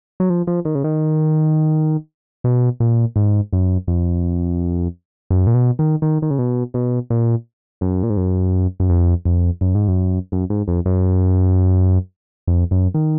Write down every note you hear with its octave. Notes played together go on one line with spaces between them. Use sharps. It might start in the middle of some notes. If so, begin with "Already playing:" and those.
F#3
F3
F3
D#3
C#3
D#3
B2
A#2
G#2
F#2
F2
F#2
A#2
B2
D#3
D#3
D#3
C#3
B2
B2
A#2
F#2
A#2
G#2
F#2
F#2
F2
F2
F#2
G#2
F#2
F#2
G#2
F2
F#2
F2
F#2
D#3